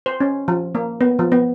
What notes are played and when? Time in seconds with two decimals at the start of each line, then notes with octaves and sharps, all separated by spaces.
0.06 C5
0.20 C#4
0.48 F3
0.75 A#3
1.01 B3
1.19 F3
1.32 B3